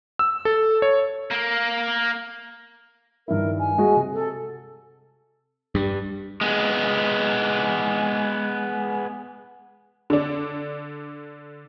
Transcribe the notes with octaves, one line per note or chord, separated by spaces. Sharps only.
E6
A4
C#5
A#3
G2 D#3 E4 A#4
G#5
G#3 F#4 G#4
C3
A4
G2
G#3 B3
D3 D4